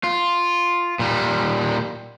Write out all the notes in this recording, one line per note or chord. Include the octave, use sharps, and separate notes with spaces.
F4
A#2 G3